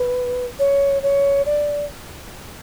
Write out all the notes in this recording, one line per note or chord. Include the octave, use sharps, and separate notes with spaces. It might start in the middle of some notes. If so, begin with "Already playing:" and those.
Already playing: B4
C#5
C#5
D5